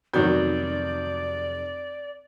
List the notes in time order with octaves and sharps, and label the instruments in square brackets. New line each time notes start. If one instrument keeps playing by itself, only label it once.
[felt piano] F1 G6 [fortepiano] B2 D#3 F#3 [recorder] D5